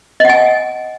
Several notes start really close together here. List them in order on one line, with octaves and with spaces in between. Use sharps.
D#5 F#5 G#5